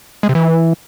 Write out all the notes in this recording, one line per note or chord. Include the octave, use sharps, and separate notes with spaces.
G#3
C3
E3